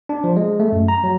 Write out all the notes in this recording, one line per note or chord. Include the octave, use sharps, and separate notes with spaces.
D4
F3
G#3
A3
F#2
A#5
F#3